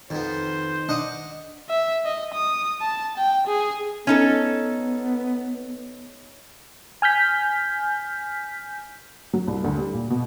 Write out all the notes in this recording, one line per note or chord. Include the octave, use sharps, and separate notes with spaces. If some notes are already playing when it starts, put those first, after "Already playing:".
F2 D#3 B3 C5
D4 D#5 F#5 D6 D#6
E5
D#5
D#6
A5
G5
G#4
B3 C#4 D#4 A4
G#5 F6 G6 B6
F#3
C2
D2
G3
A#2
B2